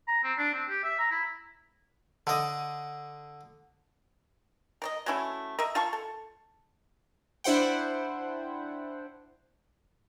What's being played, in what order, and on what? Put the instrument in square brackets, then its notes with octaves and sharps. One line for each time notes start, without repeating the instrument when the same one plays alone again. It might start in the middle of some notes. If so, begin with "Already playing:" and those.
[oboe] A#5
C4
D4
C4
G4
E5
A#5
E4
[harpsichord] D3 D#5
[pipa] A#4 D5 D#5
F#3 A3 C#4 E4
A#4 D#5 E5
F4 F5 A5 C#6
A4
[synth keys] D4 E4 C5 F#5 G5